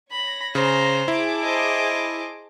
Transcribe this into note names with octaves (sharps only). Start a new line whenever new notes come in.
C#5 B5 A#6
C#3 C5 A#5
E4 G#4 A5 D6
C5 D#5